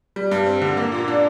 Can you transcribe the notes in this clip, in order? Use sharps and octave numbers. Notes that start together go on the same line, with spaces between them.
G3
G2
C4
D3
A#3
A#2
D4